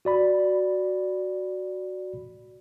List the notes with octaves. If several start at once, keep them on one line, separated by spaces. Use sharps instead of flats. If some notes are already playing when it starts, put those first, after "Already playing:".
F#4 D5 B5